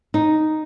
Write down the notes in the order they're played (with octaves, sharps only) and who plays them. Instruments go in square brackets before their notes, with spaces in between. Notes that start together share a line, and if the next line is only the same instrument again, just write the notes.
[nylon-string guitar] D#4